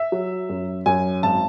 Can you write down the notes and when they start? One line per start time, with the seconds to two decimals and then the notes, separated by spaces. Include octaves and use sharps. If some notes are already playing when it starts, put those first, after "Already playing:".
Already playing: E5
0.12 F#3
0.50 F#2
0.86 F#2 G#5
1.23 G#1 A5